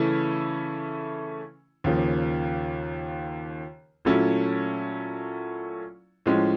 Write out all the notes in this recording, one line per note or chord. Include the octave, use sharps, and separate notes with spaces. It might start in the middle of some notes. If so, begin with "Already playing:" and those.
Already playing: C#3 E3 A3 C#4 E4
D#2 C#3 F3 A#3
A#2 F#3 A3 C#4 E4
A2 F3 G#3 C#4